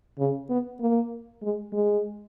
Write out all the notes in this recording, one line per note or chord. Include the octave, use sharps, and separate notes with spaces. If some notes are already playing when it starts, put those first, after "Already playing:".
C#3
B3
A#3
G#3
G#3